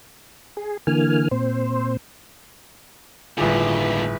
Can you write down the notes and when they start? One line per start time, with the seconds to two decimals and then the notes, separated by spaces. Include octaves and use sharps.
0.57 G#4
0.87 D3 E3 A#3 G#5 F6
1.31 A#2 C4 C5
3.38 G1 D#2 A2 D3 E4 F4 G#4 B4